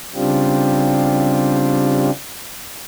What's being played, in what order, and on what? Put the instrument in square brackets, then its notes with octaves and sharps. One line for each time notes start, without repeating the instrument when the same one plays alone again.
[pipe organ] C#3 G3 C4 D4 F4 G4